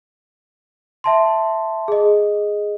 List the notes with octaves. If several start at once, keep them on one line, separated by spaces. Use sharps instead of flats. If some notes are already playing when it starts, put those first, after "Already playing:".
E5 A5 C6
G#4 D#5